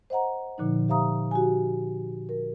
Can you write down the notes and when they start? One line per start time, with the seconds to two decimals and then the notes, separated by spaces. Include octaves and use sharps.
0.10 C5 D#5 F#5 A#5
0.58 A#2 D3 F3 D#4
0.88 G4 C5 E5 F5 A#5 D#6
1.31 F#4 G4 G#5
2.29 A#4